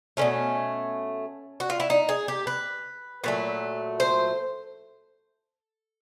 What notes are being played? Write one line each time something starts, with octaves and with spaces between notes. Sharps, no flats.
B2 F#3 A3 C#4
F#4
F4
E4
D#4
G#4
G4
B4
A#2 F#3 A3 B4
C5